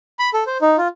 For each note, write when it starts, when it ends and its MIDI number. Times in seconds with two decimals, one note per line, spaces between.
0.19 0.30 83
0.34 0.44 69
0.47 0.57 72
0.62 0.76 63
0.78 0.88 65